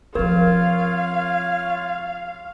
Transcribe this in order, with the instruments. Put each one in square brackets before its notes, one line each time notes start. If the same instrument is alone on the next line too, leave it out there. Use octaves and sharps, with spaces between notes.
[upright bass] F3 C4 [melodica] F4 C#5 [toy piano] A#4 [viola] F5